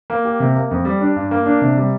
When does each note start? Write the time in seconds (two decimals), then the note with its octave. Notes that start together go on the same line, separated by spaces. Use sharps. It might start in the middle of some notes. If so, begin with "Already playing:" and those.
0.10 A#3
0.25 G4
0.40 C3
0.55 A#3
0.71 F2
0.85 G3
1.01 D4
1.16 G2
1.31 A#3
1.46 D4
1.61 C3
1.77 G3